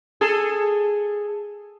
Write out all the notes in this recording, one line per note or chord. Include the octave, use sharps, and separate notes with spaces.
G#4 A4